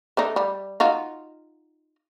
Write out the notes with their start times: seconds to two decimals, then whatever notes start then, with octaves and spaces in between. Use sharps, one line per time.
0.17 A3 D4 D#4
0.36 G3
0.80 D#4 F4 F#4